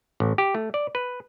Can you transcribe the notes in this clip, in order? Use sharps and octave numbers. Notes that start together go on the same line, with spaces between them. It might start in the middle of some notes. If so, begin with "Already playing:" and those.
A1
G4
A3
D5
B4